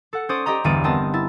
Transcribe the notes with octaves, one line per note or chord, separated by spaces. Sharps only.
A4 F#5
C#4 C5 D5 D#6
G4 D5 D#5 A#5
G1 E2 E3 D5 D#7
B3 C4 A#4 D#5 A5
E4 A6